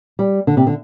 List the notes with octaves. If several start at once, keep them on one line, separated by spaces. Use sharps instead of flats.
G3
D3
C3
D3